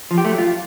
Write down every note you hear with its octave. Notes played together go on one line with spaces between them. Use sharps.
F3
G4
A3
F#3
F4